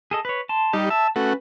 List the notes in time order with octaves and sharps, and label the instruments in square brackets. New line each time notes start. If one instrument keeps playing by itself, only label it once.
[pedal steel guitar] G#4 A4 D#5
B4 C#5
A5 C6
[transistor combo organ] G3 D#4 [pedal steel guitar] G4
[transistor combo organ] E5 [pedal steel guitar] A5
[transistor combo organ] A3 F#4 [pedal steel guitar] C#4 B4